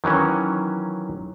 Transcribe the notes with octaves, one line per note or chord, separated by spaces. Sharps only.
D#3 E3 F#3 C#4